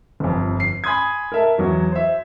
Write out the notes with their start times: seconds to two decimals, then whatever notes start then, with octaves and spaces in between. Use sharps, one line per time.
0.20 G1 F2
0.60 C7
0.84 G#5 B5 C6 D#6 G#6
1.32 A#4 E5 A5
1.58 E2 F#3 F#4
1.92 C5 E5